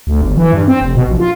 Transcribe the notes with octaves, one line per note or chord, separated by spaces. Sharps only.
D2
G1
E3
G2
C4
F1
B2
A#1
F4